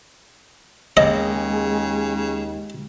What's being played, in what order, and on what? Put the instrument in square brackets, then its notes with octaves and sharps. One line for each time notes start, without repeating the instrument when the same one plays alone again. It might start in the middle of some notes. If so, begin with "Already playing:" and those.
[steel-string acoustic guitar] D#2 [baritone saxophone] C#3 [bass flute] G#3 [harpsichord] D#5